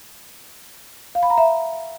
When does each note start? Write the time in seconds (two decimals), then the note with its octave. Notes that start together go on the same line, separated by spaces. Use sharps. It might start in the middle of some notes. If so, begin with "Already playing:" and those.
1.15 F5
1.23 B5
1.30 A#5
1.38 E5